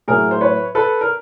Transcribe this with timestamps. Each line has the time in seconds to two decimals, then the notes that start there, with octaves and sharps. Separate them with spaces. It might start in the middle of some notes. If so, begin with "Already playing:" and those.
0.08 A2 F#3 G#4 A#4
0.31 C5
0.41 B4 C#5
0.75 A4 B4
1.01 A#4